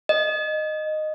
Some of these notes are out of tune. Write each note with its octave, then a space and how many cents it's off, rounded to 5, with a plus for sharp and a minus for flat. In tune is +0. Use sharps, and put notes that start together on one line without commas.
D#5 -10